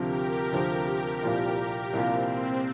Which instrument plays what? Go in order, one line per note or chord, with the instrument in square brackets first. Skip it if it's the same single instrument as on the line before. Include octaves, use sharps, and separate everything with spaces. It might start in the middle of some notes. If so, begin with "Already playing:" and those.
Already playing: [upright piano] D2 C3 F3 C4 [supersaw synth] G4 A#4
[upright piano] D2 C3 F3 C4
C2 A#2 F3 A#3 F4
[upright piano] C2 A#2 F3 A#3 F4 [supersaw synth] C4